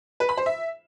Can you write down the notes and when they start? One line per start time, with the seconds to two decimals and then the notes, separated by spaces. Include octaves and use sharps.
0.20 B4
0.29 B5
0.37 C5
0.46 E5